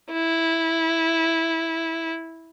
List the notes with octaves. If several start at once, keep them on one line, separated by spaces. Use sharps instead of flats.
E4